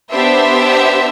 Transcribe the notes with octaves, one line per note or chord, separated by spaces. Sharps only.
B3 D4 G4 C5 E5